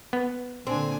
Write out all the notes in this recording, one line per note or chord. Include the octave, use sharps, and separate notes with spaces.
B3
A#2 D3 C4 D4 G#5